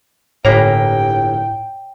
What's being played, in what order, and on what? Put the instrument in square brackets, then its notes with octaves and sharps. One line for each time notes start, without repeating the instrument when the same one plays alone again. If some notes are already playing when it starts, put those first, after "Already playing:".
[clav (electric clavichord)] G1 A#3 A#5 [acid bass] A2 [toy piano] C#5 F5 G#5 [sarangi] G5